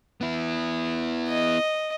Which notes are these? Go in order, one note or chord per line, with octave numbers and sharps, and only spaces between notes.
B3 E4
D#5